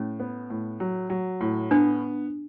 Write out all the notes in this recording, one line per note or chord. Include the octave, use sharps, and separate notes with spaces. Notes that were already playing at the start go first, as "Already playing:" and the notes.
Already playing: A2 C#4
B3
A2
F#3
F#3
A2
B3 D4